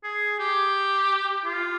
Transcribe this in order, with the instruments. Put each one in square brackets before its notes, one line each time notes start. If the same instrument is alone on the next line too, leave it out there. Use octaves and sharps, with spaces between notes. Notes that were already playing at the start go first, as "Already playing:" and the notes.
[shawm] G#4
G4
F4